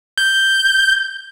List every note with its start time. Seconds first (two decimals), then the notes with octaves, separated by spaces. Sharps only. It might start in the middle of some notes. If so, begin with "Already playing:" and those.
0.18 G6